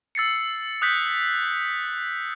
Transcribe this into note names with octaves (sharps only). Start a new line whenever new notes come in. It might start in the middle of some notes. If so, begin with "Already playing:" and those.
E6 A6 C7 C#7
D#6 F#6 G6 B6